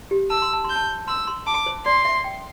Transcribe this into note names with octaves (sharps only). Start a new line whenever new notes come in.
G4
A5 E6
C6
A5
C6 G6
A5
C6 E6
C6
A5 D6
C5
D5 C6
E5
G5